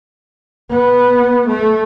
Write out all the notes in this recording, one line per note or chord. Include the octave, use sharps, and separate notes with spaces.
B3
A3